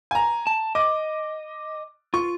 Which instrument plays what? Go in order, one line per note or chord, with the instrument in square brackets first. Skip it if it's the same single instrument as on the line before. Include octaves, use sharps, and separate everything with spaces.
[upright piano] G#5 A#5
[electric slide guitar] A5
[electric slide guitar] D#5 [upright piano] D6
[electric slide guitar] F4 [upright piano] C#6